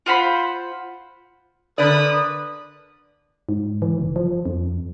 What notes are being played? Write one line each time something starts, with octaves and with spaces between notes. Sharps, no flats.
F4 C5 F#5 B5
D3 A#4 B4 D5 D#6
G#2
E3
F#1
F3
F2